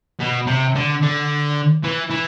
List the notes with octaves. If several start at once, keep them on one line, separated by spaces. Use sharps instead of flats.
B2
C3
D3
D3
E3
E3